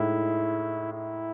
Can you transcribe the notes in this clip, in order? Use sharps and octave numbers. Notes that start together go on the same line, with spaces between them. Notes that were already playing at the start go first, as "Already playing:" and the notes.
Already playing: A2 G#3 D#4 E4
E4